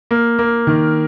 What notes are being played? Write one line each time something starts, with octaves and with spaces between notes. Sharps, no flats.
A#3
A#3
D#3